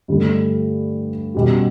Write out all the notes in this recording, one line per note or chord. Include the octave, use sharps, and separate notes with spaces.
G2 D3 A3
B2 G3 C#4 F#4